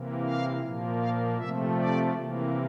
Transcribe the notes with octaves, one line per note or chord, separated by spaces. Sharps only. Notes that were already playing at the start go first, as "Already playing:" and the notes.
Already playing: C3 E3 A#3
F5
A#2 F3 A#3
F5
C3 F3 A3 E5
D5
C3 E3 A#3